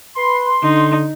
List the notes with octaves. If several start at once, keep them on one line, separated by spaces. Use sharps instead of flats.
B4 C6
D3 D#4